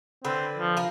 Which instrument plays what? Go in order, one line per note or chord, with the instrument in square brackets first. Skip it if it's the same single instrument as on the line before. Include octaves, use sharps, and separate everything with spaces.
[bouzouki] D3 B4 [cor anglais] C4
[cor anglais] F3
[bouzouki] F4 A#4